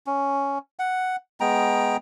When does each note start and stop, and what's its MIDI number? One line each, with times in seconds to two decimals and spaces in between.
0.06 0.58 61
0.79 1.16 78
1.40 1.97 56
1.40 1.97 59
1.40 1.97 79
1.40 1.97 82